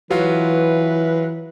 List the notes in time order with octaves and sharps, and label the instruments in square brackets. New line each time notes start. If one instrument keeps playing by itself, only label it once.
[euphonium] E3 [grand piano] F#3 F4 [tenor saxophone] B4